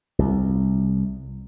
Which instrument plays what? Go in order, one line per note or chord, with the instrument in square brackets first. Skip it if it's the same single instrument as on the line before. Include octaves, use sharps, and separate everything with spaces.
[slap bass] C2